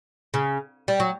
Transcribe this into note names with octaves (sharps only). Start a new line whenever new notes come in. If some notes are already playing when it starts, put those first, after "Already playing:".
C#3
G3
F#3